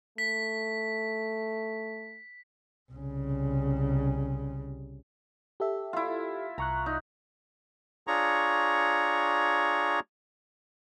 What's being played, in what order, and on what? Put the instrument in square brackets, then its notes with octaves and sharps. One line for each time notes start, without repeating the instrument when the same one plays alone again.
[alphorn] A3 [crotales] B6
[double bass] C2 C#3
[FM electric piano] G4 A4 E5
[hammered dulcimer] E4 F4
[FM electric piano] C2 C#6 F#6 [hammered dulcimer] A#5
[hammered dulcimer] D#4
[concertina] D4 F4 G#4 C#5 A#5 C#6